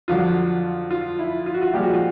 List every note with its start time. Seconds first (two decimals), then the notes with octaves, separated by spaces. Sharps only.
0.08 F2 D3 F#3 F4
0.91 F4
1.19 E4
1.46 F4
1.54 F#4
1.62 F4
1.73 A#2 F3 G#3 G4
1.83 F#4
1.94 F4